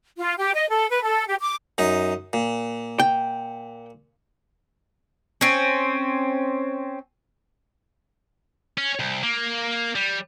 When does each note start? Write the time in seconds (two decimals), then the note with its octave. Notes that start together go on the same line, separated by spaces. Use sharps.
0.18 F4
0.38 G4
0.53 D#5
0.69 A4
0.88 B4
1.03 A4
1.28 G4
1.39 D6
1.78 F#2 D#4
2.33 A#2
3.00 G5
5.41 C4 C#4
8.78 C#4
8.99 C2
9.23 A#3
9.95 G3